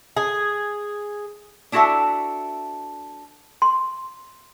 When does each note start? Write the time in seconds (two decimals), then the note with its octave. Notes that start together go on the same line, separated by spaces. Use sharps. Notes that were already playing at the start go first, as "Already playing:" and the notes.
0.17 G#4
1.72 D4 E4 F#4 A4 E5 F#5
3.62 C6